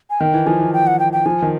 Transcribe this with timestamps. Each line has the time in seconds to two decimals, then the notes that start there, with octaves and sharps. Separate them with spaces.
0.10 G#5
0.20 D#3 G5
0.34 E3
0.46 F3 G#5
0.60 E3
0.73 G5
0.87 F#5
0.99 G5
1.13 G5
1.26 F3 G#5
1.42 D#3